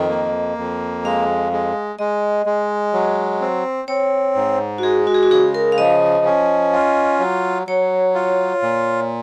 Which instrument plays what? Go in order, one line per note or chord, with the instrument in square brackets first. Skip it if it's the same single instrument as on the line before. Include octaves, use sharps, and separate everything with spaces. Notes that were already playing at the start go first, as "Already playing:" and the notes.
Already playing: [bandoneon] F2 D#3 [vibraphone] D#5
[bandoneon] A#3
F2
[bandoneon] G#3 [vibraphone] F5
[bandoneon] G#3
[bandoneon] G#3 [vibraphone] D#5
[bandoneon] G#3
F#3
C4
[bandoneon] C4 [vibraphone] C#5
[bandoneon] G#2
[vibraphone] F#4
[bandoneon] G#3 [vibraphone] G#4
[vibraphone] F#4
G#4
F#4
[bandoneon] C#3 [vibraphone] G#4
[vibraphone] A#4
F5
[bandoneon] F3 [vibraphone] D#5
[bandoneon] C#4
F4
F#3
[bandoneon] F#3 [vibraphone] C#5
[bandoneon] F4
A#2